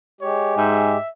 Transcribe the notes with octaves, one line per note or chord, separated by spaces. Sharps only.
G#3 G4 C#5
G#2 E5